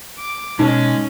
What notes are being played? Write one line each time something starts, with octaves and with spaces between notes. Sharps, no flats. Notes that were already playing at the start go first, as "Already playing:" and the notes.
D6
B2 G#3 C#4 D#4 D#5